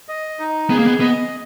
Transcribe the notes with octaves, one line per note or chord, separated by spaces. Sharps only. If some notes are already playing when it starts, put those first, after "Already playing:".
D#5
D#4
B3 G#4
A#3
B3
B3 D#5